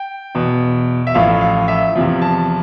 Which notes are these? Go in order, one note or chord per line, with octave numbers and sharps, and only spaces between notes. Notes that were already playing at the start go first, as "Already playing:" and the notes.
Already playing: G5
E2 B2
E5
A1 A2 F3 F5
F5
E5
E2 C3 F3
A5